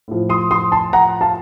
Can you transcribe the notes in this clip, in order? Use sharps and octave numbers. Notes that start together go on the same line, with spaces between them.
A2 F3
C6 D#6
C6 D#6
A5 C6
F#5 A#5
F5 A5